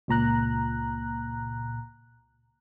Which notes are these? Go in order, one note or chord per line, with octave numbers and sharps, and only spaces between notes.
C#2 A#2 A#5 F#6